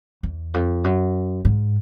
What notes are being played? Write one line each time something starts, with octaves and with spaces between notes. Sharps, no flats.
E2
F2
F#2
G#2